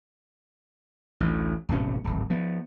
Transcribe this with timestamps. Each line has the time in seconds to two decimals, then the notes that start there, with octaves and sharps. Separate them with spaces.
1.20 A1 D2
1.69 D1 G#1 B2 C#4
2.04 D1 G#1
2.30 F3 B3